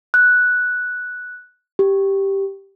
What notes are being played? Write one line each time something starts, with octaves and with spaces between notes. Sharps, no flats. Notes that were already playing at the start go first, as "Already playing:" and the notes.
F#6
G4